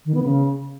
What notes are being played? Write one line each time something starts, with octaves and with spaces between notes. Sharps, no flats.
D#3
B3
C#3